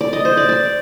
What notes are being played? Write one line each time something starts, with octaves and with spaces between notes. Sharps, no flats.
D5
D#5
C5
D5
D5